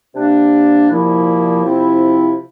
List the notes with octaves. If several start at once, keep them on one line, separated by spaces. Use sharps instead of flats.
C3 G3 A#3 D4
C2 A#2 F3 A#3 E4
C3 F3 C4 E4